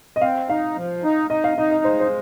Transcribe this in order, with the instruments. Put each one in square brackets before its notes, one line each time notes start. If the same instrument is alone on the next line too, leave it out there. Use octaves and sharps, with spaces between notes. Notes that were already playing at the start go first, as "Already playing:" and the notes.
[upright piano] D#5
[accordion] C4 [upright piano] F5
[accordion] D#4 [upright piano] F5
[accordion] F3
D#4
[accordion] D#4 [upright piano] D#5
[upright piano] F5
[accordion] D#4 [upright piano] D#5
[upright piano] D#5
[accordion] G#3 [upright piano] C5
[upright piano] C5